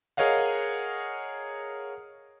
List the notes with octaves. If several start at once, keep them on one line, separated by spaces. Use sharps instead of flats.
G#4 A#4 C#5 D#5 F5 F#5